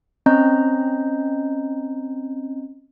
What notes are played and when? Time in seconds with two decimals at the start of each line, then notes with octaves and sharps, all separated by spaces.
0.26 C4 C#4 D#5 A#5 G6